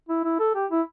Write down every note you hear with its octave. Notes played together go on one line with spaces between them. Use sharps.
E4
E4
A4
G4
E4